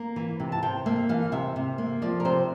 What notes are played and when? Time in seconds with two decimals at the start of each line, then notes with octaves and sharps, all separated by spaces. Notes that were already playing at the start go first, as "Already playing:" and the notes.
Already playing: A#3
0.16 E3
0.40 C3
0.52 A5
0.63 C3 G5
0.86 A#3 E5
1.09 E3 F5
1.32 C3 E5
1.56 C3
1.78 A#3
2.02 F3 D5
2.20 A#4
2.25 C3 C5